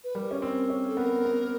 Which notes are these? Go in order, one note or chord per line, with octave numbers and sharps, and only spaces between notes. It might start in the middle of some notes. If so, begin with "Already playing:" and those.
B4
G3 A#4
C#4
C4
C#4
A4
B3 A#4
B3